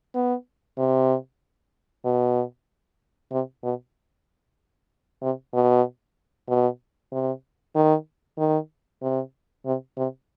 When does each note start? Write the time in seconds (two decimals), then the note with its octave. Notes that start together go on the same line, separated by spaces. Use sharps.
0.15 B3
0.78 C3
2.05 B2
3.32 C3
3.63 B2
5.22 C3
5.54 B2
6.49 B2
7.12 C3
7.75 D#3
8.38 D#3
9.02 C3
9.65 C3
9.97 C3